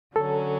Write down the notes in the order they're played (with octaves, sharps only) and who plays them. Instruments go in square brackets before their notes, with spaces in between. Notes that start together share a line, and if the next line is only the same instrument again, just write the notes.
[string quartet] D3 F#3 C#4 [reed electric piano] A4